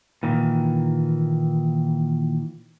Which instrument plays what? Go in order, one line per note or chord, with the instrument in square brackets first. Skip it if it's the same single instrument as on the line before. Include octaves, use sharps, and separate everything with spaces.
[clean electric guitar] A#2 D#3 E3